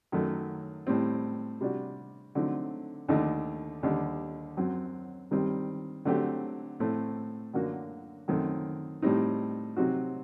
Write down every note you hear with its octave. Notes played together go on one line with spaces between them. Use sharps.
F#2 D#3 F#3 A3
A2 G3 C4
C3 G3 D4 F#4
D3 F#3 A3 C4 D#4
D#2 D3 A3 D#4
D#2 D3 G3
F#2 F#3 C4
G2 D#3 G3 C4
D3 F#3 A3 C4 G4
A2 A3 C4
F#2 D3 F#3 A#3 F#4
F#2 D#3 A3 C4
A2 G3 C4 D#4
C3 F#3 C4 D#4 F#4